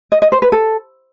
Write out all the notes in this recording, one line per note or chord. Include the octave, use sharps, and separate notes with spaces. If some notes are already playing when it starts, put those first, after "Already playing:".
D#5
D#5
C5
B4
A4